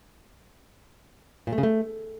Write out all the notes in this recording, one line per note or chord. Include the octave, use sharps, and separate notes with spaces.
A#2
A3
C#3
A3